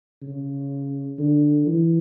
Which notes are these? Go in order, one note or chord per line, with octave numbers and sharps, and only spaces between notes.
C#3
D3
E3